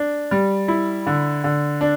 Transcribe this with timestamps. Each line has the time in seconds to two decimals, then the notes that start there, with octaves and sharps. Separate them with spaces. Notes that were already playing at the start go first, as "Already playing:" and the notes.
Already playing: D4
0.31 G3
0.68 E4
1.07 D3
1.44 D3
1.81 D4